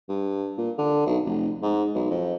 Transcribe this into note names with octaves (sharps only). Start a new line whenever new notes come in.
G2
A#2
D3
B1
F1
G#2
B1
F2